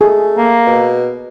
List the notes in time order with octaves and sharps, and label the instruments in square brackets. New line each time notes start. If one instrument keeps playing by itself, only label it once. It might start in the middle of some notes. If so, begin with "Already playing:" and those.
[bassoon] A3 [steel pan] G#4
[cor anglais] A#3
[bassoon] B2